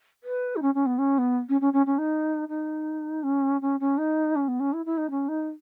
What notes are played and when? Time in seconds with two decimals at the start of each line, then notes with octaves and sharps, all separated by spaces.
0.24 B4
0.56 D#4
0.62 C#4
0.74 C#4
0.86 B3
0.98 C#4
1.18 B3
1.49 C#4
1.61 C#4
1.73 C#4
1.86 C#4
1.98 D#4
2.49 D#4
3.23 C#4
3.61 C#4
3.80 C#4
3.98 D#4
4.36 C#4
4.48 B3
4.60 C#4
4.73 E4
4.86 E4
4.97 D#4
5.10 C#4
5.28 D#4